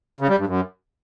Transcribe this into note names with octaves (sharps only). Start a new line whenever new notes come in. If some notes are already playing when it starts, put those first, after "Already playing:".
C#3
G3
G2
F#2